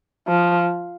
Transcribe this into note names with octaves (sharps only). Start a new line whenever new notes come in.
F3